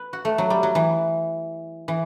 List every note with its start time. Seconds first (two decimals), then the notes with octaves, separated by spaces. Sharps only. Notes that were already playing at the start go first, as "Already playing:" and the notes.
Already playing: B4
0.13 F#4
0.25 A3
0.38 F#3
0.50 G3
0.63 F#3
0.75 E3
1.88 E3